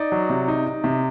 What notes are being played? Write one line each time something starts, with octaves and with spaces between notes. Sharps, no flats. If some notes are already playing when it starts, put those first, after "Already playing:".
Already playing: D#4 D5
F#3
C3
D#4
D#4
C3